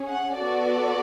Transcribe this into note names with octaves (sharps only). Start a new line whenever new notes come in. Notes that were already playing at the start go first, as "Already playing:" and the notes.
Already playing: C#4 G#4
F#5
B3 F#4 A4 D5